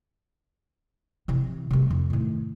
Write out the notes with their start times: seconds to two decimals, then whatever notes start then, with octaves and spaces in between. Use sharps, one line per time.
1.28 C3 E3
1.71 C3 G3
1.90 F2
2.10 A2 D#3